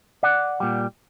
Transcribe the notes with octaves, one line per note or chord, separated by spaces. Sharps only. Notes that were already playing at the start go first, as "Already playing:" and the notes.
D5 F#5
A#2 G3